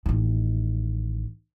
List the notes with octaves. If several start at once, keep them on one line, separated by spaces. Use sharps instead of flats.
A1 D#3